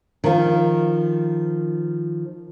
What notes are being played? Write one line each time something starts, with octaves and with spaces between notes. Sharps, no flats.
D#3 F3